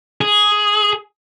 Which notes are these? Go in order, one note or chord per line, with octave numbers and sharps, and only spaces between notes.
G#4